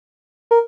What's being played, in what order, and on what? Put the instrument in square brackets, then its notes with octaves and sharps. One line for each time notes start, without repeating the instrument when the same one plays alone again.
[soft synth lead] A#4